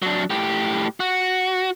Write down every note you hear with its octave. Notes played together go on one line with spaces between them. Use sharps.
F#3 D4
A2 G4
F#4